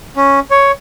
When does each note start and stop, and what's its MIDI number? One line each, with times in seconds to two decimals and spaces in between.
0.16 0.40 61
0.51 0.72 73